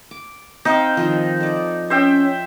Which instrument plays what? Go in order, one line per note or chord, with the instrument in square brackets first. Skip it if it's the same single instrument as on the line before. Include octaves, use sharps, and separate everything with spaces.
[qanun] D6
[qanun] C4 F5 G5 [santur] D#4
[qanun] D#3 F3
A4 D5
[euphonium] C#4 [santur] C5 E5 G5